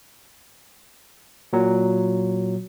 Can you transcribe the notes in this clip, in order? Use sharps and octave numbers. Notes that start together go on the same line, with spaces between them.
A#2 F#3